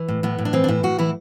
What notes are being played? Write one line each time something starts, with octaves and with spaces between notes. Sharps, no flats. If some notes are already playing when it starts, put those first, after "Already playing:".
Already playing: E3
A2
A2 B3
A2
D4
E3 C4
D4
A2 E4
A2 F#4
E3 E4